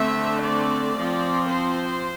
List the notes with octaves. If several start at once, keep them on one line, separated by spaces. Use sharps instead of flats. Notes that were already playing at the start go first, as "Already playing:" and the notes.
Already playing: D3 A3 C4 E5
D5
F3 C4
C5